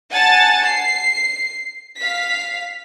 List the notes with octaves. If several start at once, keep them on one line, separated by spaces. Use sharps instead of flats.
F#5 G#5 A5 A6
C7
F5 B6